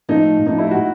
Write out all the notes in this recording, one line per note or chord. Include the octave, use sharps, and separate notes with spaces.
A2 F3 A3 D#4
A2 F3 A3 D#4
E4
F#4